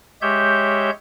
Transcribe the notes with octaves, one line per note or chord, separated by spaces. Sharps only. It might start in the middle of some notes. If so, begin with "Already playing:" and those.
G#3 G4 C#5 E5 G6